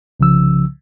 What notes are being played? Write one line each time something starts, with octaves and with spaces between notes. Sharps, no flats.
C2 C#3 F3 E6